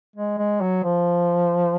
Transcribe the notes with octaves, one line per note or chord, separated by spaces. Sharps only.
G#3
G#3
F#3
F3